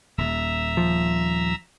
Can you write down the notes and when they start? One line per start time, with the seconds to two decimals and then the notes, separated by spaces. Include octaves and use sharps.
0.18 D#1 D#2 E5 A#5 E6
0.77 F3